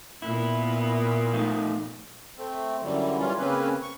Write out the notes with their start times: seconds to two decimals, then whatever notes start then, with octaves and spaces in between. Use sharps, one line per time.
0.22 A#2 A#3 B3 E4
1.33 F3 A3 D#4
2.38 A3 C4
2.83 F#2 D3 E3 F#3 G3
3.18 E3 G3 C#4 F4
3.38 C#3 A#3 C4 C#4 B4
3.82 C#6